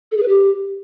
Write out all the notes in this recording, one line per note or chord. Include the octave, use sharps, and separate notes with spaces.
A4
G#4
B4
G4